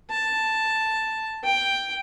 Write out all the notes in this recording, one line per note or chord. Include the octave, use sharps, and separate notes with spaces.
A5
G5